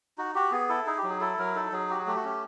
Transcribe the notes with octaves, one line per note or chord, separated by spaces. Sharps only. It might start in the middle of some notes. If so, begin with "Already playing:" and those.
D#4 F#4
F#4 G4
B3 G#4
E4 A4
D#4 G#4
G4
F#3
G#4
E4 A4
F#3 A#4
D#4 A4
F#3 G#4
F#4 G4
G#4
A3 G4
F#4
C#4 G4